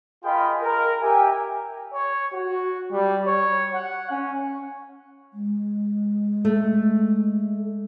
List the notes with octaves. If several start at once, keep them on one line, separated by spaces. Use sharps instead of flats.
F4 G#4 A#4 D#5 G5 B5
A#4
G4 E5 G5 G#5
C#5
F#4
G3
C#5
F#5
C#4
G#3
A3